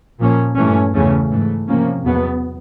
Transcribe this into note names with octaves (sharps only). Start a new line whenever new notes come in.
A#2 F3 A#3 C#4
G2 E3 A3 C#4
E2 C#3 E3 A3 C#4
G#2 E3 A3
C3 F3 A#3 C#4
E2 B2 F#3 B3